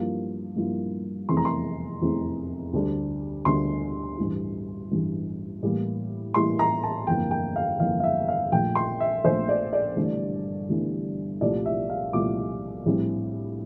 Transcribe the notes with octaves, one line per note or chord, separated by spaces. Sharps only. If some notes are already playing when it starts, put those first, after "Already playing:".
Already playing: G2 F3 A#3 E4
G2 F3 A#3 E4
F1 E2 E3 A3 C4 C6
A#5
C6
F1 E2 E3 A3 C4
D2 D3 G3 D4
D2 D3 G3 D4 C6
A1 G2 E3
A1 G2 E3
A2 E3 G3 A#3
A2 E3 G3 A#3 C6
A#5
A5
G1 F2 E3 A#3 G5
G5
F5
G1 F2 E3 A#3 F5
F5
E5
F5
A#1 A#2 A3 G5
C6
E5
A#1 A#2 A3 C5
D5
D5
G1 G2 E3 A3
G1 G2 E3 A3
C2 A#2 F3 A3 E4 D5
E5
F5
C2 A#2 F3 A3 E4 D6
A#1 A2 G3 C4 E4